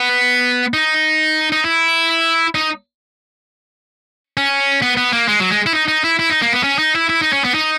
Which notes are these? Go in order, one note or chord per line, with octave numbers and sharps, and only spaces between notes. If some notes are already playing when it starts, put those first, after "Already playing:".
Already playing: B3
D#4
D#4
E4
D#4
C#4
B3
B3
A#3
G#3
F#3
G#3
E4
D#4
D#4
E4
E4
D#4
A#3
B3
C#4
D#4
E4
E4
D#4
C#4
B3
D#4